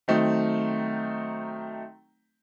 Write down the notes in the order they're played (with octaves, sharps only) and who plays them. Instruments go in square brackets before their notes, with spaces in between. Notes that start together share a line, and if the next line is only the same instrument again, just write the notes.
[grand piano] D#3 F#3 A3 C4 D#4